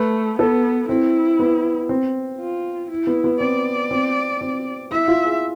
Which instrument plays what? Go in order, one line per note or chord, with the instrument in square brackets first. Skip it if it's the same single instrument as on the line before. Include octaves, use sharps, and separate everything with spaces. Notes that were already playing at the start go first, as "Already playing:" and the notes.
Already playing: [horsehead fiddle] A3 [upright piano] B4
[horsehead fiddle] B3 [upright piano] A4
[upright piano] C4 [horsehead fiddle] E4
[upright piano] B3
C4
[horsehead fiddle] F4
E4
[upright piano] B3
B3
[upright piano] C4 [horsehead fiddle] D5
[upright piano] C4
C4
[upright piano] E4 [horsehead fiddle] E5
[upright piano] F4
G#4